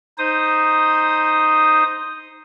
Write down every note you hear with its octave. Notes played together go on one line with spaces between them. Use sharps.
D#4 C5 D#6